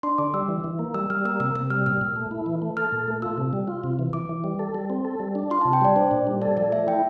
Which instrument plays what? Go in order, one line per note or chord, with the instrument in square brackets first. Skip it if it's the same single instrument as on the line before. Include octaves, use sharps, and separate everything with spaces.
[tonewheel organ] D4 [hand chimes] C6
[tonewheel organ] D3 [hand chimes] D6
[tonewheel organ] G3 [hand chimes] E6
[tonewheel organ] E3
E3
A#3
[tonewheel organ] G3 [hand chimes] E6
[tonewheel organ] G3 [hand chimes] F6
[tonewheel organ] A#3 [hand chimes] E6
[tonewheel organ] C3 [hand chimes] E6
[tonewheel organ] C3 [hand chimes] E6
[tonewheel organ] G3 [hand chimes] F6
[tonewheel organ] A#2 [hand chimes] F6
[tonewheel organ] A#2
A3
E4
E3
A3
[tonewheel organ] A4 [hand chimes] F6
[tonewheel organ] A#2
A3
[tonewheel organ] F4 [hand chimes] E6
[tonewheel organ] C3
G3
F4
C3
E3
[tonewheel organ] E3 [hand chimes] D6
[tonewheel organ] E3
G3
A4
G3
C4
A4
G3
D4
[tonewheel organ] F4 [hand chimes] C6
[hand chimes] A5
[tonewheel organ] C3
[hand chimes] G5
[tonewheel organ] G3 [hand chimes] D5
[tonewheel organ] D4 [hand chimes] C5
[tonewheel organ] A#2
G3
[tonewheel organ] A4 [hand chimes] D5
[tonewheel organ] F3 [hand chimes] D5
[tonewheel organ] A3 [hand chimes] E5
[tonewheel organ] E4 [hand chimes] G5